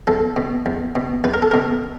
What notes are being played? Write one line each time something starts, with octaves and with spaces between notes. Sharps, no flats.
E2 A4
B2
E2
B2
E2 B4
A#4
A4
B2 A#4